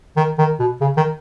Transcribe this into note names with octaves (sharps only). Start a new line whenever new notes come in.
D#3
D#3
B2
C#3
D#3